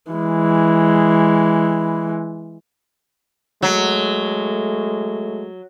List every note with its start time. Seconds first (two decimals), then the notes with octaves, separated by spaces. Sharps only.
0.12 E3 G#3
3.62 F#3 G#3 A3